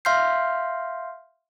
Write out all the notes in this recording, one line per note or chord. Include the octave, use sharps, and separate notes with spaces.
E5 F5 C6 F6 G6 C7